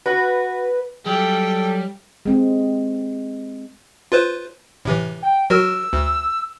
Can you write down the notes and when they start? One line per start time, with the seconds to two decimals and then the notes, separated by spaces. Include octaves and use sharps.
0.06 F#4 B4
1.06 F#3 G3 A4 G5
2.25 G#3 C4
4.12 F4 B4 C5
4.85 A2 C3 E3
5.23 G5
5.50 F#3 F#4 A#4 E6
5.93 D2